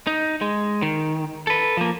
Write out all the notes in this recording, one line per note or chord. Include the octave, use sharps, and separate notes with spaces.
D#4
G#3
D#3
A4 B4
F3 A#3